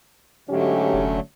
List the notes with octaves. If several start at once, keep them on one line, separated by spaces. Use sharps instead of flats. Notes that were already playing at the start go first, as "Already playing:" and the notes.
G#2 D3 F#3 A3 C#4 G4
F1